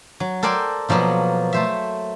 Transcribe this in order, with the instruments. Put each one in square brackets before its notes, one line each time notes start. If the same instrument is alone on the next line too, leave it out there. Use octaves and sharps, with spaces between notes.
[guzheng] F#3
A4 A#4 C5 D5 G5 G#5
B2 F3 F#3 A#3 B3
A3 C5 E5